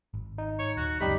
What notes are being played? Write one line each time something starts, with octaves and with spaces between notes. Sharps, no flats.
G#1
D#4
C#5
D#1 F#4
C#2 F#2 C3 G3 D#4 G4 B5